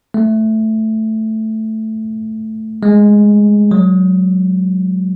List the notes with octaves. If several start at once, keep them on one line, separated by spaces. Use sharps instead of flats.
A3
G#3
F#3